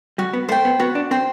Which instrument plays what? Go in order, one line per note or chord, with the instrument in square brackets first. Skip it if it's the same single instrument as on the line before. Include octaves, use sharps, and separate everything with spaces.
[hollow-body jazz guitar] G3 [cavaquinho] F#4
[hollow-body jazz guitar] B3
[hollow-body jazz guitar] A3 [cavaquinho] C5
[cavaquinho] G5
[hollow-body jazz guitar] B3
[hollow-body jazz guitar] B3 [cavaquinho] F#4
[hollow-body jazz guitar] D4
[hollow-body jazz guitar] C4 [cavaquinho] C5 G5